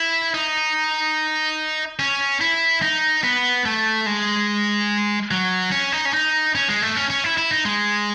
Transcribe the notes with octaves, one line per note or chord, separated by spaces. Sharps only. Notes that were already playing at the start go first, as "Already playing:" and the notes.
Already playing: E4
D#4
C#4
E4
D#4
B3
A3
G#3
F#3
C#4
D#4
C#4
D#4
C#4
G#3
A3
C#4
C#4
E4
E4
D#4
G#3